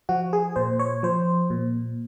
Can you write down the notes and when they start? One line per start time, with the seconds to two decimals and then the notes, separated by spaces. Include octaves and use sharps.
0.09 F3 F#4
0.33 G#4
0.56 A#2 C5
0.79 C#5
1.03 F3 C5
1.50 A#2